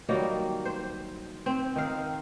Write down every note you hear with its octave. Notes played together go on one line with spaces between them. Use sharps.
D#3 F#3 G3 A#3
C5
C4
D#3 A#4 F5